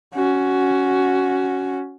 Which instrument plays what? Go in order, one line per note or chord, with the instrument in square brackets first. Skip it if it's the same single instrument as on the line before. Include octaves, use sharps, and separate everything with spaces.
[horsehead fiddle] C#4 F#4